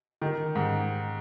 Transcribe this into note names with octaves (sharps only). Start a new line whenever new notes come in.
D#3
G#2